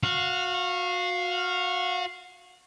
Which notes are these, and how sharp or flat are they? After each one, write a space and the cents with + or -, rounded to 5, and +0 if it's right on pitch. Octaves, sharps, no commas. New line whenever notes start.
F#4 -25 F5 +0